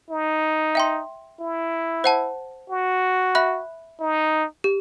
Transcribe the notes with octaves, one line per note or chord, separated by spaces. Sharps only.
D#4
E5 G5 C6
E4
C5 F#5 A5
F#4
E5 B5 F#6
D#4
G4